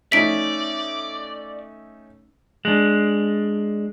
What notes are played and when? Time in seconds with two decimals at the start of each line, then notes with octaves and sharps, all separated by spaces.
0.12 A3 C#4 D#4 D5 B6 D7
2.65 G#3 D4